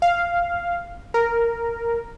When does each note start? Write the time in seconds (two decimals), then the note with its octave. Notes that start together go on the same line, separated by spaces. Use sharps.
0.02 F5
1.14 A#4